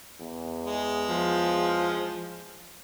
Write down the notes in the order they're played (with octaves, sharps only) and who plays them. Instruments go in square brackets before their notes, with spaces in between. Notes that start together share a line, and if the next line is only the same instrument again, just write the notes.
[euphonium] E2
[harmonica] G#3
[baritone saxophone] F3